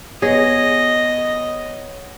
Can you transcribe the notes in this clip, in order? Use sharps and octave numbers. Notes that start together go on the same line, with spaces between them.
B3 G#4 C#5 D#5 A#6